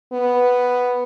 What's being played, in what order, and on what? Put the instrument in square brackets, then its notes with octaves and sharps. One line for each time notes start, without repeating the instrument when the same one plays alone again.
[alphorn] B3